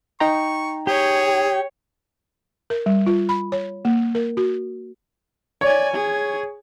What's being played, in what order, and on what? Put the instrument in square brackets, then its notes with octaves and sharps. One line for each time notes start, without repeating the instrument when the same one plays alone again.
[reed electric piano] D#4 G5 A#5 [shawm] C#6
[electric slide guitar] G4 [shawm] G#4 [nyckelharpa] C#5 C#6
[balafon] A#4
G3
F4
B5
C#5
A#3
A#4
F#4
[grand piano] C#5 [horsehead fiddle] D5 G#5
[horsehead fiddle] G#4